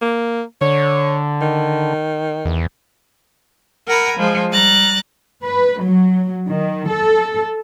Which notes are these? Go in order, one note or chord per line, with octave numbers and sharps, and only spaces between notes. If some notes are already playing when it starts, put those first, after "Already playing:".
A#3
D3 C#5
D#3
E2
A#4 F#5 G#5 A#5 B5
F3 G#3
G3 A#5 F#6 A6
B4
F#3
D#3
A4